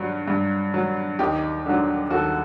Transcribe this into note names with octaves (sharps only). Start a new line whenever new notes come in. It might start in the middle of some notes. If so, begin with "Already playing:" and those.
Already playing: G2 F#3
G2
F#3
D#2 D#4 G4
D3 F#3
D#2 F#4 A4